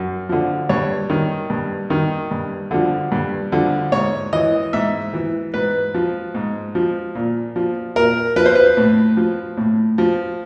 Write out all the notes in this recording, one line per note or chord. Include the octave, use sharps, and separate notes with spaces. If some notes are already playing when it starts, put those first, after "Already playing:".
Already playing: F#2
D3 F3
G2 C#5
D#3
G2
D#3
G2
D3 F3
G2
D3 F3
G#2 C#5
E3 D#5
G#2 E5
E3
G#2 B4
F3
G#2
F3
A#2
F3
A#2 A#4
F3 B4
C5
B4
A2
F3
A2
F3